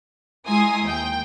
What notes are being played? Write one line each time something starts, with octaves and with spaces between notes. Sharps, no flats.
G#3 E4 G#5 A#5 C6 D#6
D#2 G5